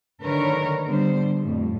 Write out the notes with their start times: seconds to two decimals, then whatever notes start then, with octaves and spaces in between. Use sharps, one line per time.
0.21 D3 D#3 A#4 B4 C#5
0.85 D3 G3 B3 C5
1.39 F2 A2 G3